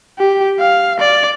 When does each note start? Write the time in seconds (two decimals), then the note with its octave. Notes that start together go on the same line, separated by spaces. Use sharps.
0.19 G4
0.59 F5
1.00 D5